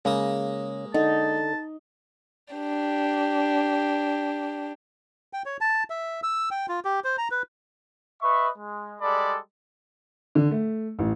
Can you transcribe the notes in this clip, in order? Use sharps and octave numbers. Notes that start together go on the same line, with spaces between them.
C#3 G#3 A#3 D#6
D3 D#4 A5
D4 G4
G5
C#5
A5
E5
E6
G5
F4
G4
C5
A#5
B4
B4 D#5 E5 C#6
G#3
G3 G#3 A4 D5 B5
D3
A3
A1